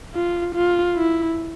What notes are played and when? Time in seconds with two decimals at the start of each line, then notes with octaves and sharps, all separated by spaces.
0.15 F4
0.55 F4
0.96 E4